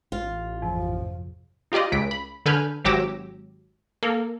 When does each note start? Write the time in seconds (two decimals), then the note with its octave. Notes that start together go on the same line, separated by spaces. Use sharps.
0.12 A1 F4
0.62 F2 G#2 C3 F3
1.72 D#4 F4 G4 D5 D#5
1.92 C#2 B6 D7
2.11 B5
2.46 D3 A4 B4 G#5 F6 G6
2.85 G#1 F#3 G4 D6 E6 A#6
4.03 A#3 A4